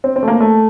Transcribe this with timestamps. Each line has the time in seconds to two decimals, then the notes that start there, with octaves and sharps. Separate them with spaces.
0.04 C4
0.16 C4
0.23 A3
0.28 A#3
0.40 A3